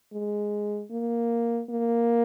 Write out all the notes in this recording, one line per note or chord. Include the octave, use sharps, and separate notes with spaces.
G#3
A#3
A#3